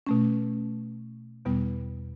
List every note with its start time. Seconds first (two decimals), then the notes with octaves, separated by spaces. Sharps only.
0.06 B2 A3 C#4
1.45 E2 B2 G3 B3